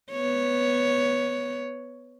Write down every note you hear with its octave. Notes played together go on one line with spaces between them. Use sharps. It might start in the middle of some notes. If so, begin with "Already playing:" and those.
B3 C#5